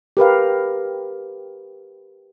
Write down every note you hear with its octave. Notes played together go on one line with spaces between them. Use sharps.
G4 A#4 B4 F5